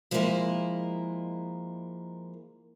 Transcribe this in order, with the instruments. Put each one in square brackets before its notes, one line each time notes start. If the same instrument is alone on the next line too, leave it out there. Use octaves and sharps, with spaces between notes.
[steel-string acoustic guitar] F3 G#3 A#3 E4 A#4 D#5